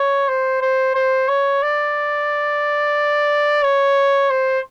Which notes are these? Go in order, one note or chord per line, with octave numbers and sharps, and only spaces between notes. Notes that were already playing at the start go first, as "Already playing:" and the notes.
Already playing: C#5
C5
C5
C5
C#5
D5
C#5
C5